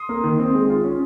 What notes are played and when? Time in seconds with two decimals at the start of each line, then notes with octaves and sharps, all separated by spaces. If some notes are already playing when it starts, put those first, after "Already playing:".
Already playing: C6 D#6
0.09 A#3
0.24 D#3
0.39 C4
0.54 G#3
0.70 F4
0.84 C#4